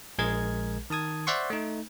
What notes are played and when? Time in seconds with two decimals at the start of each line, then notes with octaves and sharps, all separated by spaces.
0.18 A#1 G#3 G#4 A#4 G#6
0.90 D#3 A5 D#6 G#6
1.27 C5 D5 E5 F#5 C6 C#6
1.50 A3 D#4